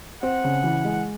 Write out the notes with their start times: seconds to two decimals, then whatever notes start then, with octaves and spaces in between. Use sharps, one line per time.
0.23 C4 F#5
0.44 C#3
0.63 E3
0.84 G#3